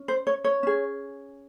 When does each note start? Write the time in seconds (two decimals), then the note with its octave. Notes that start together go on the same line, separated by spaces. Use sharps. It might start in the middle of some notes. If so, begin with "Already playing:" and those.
Already playing: C#4
0.08 C5
0.27 C#5
0.44 C#5
0.63 C#4 G#4